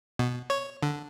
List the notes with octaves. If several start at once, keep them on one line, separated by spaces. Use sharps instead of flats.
B2
C#5
D3